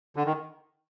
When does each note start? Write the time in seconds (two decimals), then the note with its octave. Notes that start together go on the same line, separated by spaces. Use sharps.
0.16 D3
0.26 D#3